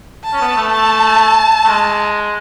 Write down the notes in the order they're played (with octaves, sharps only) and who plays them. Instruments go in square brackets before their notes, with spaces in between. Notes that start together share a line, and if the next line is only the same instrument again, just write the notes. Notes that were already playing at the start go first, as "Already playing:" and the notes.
[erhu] A5
[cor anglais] C#4
B3
A3
[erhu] A5
[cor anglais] A3
G#3